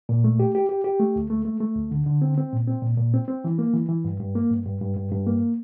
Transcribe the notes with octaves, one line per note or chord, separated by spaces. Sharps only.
A#2
A3
G4
G4
G4
G4
A3
D2
A3
A3
A3
D2
D3
D3
C4
C4
A#2
C4
A#2
A#2
C4
C4
E3
A#3
E3
E3
G2
G2
A#3
G2
G2
G2
G2
G2
A#3